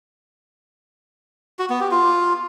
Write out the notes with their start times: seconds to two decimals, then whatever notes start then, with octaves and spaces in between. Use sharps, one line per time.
1.59 F#4
1.70 B3
1.80 G4
1.91 F4